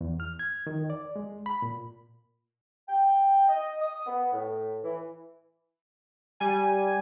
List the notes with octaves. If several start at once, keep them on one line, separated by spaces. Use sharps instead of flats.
E2
F6
G#6
D#3
D5
G#3
B5
A#2
G5
D#5
D#6
B3
A2
E3
G3 G#5